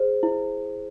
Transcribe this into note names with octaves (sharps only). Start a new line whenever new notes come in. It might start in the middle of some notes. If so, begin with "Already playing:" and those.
Already playing: G#4 C5
E4